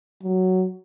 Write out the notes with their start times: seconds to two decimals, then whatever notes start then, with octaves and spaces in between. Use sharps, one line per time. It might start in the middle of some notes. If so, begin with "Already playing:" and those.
0.23 F#3